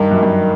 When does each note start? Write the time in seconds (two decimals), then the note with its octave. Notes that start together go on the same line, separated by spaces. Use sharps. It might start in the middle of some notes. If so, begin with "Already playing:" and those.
Already playing: G2 D#3
0.11 F#2
0.23 G2